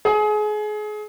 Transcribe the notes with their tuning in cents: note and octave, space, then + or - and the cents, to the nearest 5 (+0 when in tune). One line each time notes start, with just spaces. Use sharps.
G#4 +30